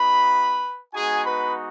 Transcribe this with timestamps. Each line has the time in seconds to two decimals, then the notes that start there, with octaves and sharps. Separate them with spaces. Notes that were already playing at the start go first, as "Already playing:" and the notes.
Already playing: B3 D#4 F#4 B4 B5
0.94 G#3 B3 D#4 F#4 G#4 G#5
1.26 B4 B5